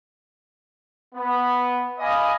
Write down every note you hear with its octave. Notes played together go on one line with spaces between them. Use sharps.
B3
D5 D#5 F5 G#5 B5 D#6